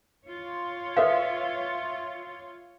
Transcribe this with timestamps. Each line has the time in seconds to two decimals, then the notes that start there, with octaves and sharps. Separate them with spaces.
0.25 F4 C#5
0.97 A4 B4 E5 F5